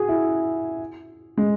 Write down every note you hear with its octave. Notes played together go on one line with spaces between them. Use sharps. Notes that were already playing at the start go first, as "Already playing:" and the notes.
Already playing: F#4 G#4
E4
G#3